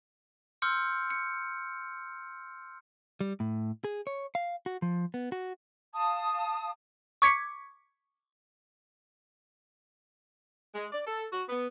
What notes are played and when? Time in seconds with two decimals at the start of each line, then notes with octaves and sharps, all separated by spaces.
0.62 C6 D6 E6 F6 G6 C#7
1.10 C#7
3.21 G3
3.40 A2
3.84 G#4
4.07 C#5
4.35 F5
4.66 F#4
4.82 F3
5.14 B3
5.32 F#4
5.93 F5 A5 D#6
7.22 C#6 D6 G#6 B6 C#7
10.75 G#3
10.92 D5
11.06 A4
11.32 F#4
11.49 B3